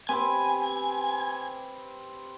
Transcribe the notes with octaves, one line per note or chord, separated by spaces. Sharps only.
C4 G4 B4 G#5